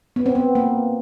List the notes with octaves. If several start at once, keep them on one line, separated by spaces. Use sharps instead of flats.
B3
C4
B3
A#3